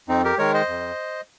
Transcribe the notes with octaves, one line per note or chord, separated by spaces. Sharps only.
F2 C4 D#4
G4 A#4
D#3 G#3 A#4 C#5
C5 D#5
F2